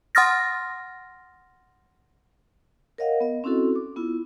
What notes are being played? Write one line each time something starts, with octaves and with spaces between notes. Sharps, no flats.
F#5 C6 D#6 F6 A6 A#6
A#4 C#5 D#5 F5 F#5
B3 D#5
C4 C#4 E4 F#4 A4
D6
B3 E4 F4